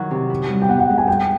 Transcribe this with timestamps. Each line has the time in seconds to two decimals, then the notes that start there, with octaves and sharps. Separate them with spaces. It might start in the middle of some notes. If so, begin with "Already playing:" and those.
Already playing: D#3 F#3 E4 F#5
0.11 C3
0.30 E4
0.50 G3
0.62 G5
0.69 B3 F#5
0.79 F#5
0.89 G#3
0.98 G#5
1.08 A2 G5